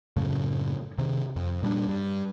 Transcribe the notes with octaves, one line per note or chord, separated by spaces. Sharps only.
F#2 A2 C#3 A3
C3 D#3
F2
A#2 G3 G#3 D4
G2